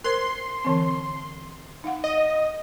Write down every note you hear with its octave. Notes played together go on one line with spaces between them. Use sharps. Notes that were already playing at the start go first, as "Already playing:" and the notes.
A#4 C5 C6
D3 E3 C4
D#4 F5 F#5
D#5